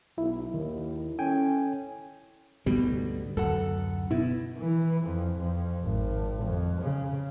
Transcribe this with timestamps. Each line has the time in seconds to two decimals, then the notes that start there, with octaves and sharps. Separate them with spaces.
0.18 B1 E4
0.54 D#2 D#3
1.19 C#4 A4 G5 G#5
2.66 D2 G#2 B2 G3
3.37 D1 F#2 A4 F#5
4.11 B2 E4
4.59 E3
5.05 F2
5.39 F2
5.84 G#1
6.43 F2
6.82 C#3